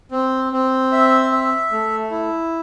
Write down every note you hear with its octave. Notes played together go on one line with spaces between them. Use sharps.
C4
C4
E5
E5
A3
E4